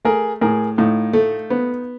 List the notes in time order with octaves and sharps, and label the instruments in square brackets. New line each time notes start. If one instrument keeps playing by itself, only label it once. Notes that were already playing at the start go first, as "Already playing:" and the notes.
[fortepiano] A3 [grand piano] G#4 A#4
[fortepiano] A2 [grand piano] G#4 A#4
[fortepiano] A2 [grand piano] D#4 F4
[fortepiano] A3
B3